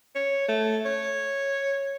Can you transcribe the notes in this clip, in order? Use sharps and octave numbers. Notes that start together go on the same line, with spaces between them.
C#5
A3
C#5